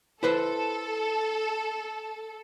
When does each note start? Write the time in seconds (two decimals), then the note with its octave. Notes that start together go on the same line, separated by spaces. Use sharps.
0.23 E4 A4 B4 C5